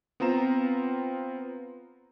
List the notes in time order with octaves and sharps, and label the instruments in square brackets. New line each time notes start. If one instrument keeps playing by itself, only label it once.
[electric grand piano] B3 C4 F4 A#5 E7